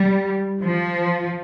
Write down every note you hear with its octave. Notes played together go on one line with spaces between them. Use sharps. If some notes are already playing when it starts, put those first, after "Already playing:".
Already playing: G3
F3